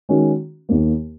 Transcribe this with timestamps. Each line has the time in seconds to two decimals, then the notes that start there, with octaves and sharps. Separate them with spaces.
0.09 D#3 G#3 C#4 F#4
0.69 D#2 D#3 A#3